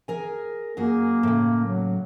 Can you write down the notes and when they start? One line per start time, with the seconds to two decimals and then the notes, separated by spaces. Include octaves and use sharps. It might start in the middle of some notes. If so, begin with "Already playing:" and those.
0.08 G#4 A#4 G#5
0.77 F#2 F#3 A#3 G#4
1.23 A2 C#3
1.64 F#3